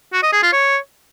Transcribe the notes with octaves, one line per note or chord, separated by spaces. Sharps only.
F#4
D#5
G#4
F4
C#5